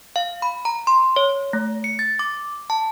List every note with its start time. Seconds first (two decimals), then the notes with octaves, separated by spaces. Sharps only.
0.16 F5
0.42 B5
0.65 A#5
0.87 C6
1.16 C#5
1.53 A3
1.84 C#7
1.99 A6
2.19 D6
2.70 A5